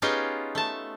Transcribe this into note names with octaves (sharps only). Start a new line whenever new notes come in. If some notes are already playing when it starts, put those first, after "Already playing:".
B3 C#4 D#4 F4 G4 G#4
A3 A5